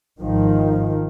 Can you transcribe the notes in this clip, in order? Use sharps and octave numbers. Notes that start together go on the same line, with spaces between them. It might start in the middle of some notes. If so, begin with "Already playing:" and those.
G#1 G#2 D#3 F3